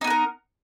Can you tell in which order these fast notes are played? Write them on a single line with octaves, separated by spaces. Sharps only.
D#4 B3 B4 A#4